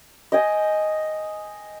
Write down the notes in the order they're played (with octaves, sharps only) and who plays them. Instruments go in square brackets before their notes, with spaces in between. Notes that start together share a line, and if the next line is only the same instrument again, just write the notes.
[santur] D#5 G5 G#5